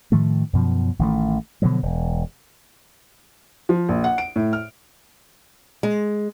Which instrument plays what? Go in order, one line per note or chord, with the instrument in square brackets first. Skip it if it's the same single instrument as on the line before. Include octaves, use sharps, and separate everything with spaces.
[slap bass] A2 D#3 F3 A3
F#2 B2 F3
A1 D#3 F#3 A3
B2 D3 F3 F#3
E1
[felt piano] F3
A#1
F#5
D7
A2
F6
[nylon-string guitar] G#3